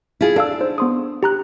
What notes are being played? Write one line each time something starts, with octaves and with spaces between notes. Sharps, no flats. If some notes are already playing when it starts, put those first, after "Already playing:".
E4 F4 G#4
D4 A4 F5 E6
D#4 C5
B3 C6 D#6
G4 A#5 F#6